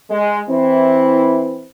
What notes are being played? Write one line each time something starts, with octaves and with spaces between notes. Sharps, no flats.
G#3
E3 C4 E4